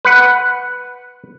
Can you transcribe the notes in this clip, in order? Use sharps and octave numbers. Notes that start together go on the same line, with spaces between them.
B4 F#5